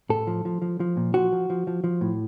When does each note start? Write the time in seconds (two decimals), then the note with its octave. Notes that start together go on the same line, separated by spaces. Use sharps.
0.09 A2 A4
0.27 F3
0.45 F3
0.62 F3
0.80 F3
0.97 A#2
1.14 F3 F#4
1.32 F3
1.50 F3
1.67 F3
1.84 F3
2.01 A2